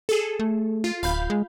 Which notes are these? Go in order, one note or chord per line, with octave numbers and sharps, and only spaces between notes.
G#4 A4
A3
F4
D1 F5 B5 G6
G#3